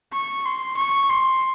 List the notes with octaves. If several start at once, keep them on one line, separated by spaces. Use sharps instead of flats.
C#6
C6
C#6
C6